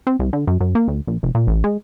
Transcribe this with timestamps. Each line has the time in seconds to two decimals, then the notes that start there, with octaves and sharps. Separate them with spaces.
0.07 C4
0.19 C2
0.33 D3
0.47 F#2
0.60 F#2
0.75 A#3
0.88 D2
1.07 A#1
1.23 F1
1.35 A#2
1.47 A1
1.64 G#3